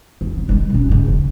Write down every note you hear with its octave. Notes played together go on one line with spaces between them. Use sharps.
E2
C2
D#3 G3
B2 C#4
G2 C#3
F#1 D#2